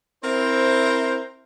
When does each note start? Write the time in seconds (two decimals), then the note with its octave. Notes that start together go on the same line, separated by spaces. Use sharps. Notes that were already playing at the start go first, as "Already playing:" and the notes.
0.24 C4 E4 A#4 C5